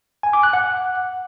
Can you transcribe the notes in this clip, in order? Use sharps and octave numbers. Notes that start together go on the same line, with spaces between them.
G#5
D6
F#6
F#5